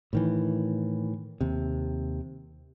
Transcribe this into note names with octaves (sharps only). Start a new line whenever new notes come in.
A2 D#3 E3
D#2 C3